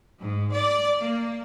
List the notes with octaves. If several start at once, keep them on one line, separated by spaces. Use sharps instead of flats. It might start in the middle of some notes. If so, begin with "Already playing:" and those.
G#2
D5
A#3